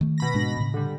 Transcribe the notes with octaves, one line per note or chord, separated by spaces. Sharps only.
D#3 A3
B2 B5 A#6
G#2 G#3 D4
A2 C#3
D3 G3